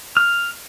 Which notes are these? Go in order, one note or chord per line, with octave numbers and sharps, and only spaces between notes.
F6